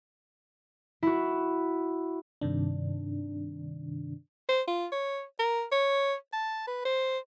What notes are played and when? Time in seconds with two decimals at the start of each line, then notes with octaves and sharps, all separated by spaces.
1.03 E4 F#4
2.41 G2 C3 D#3 D4
4.49 C5
4.68 F4
4.92 C#5
5.39 A#4
5.72 C#5
6.33 A5
6.67 B4
6.85 C5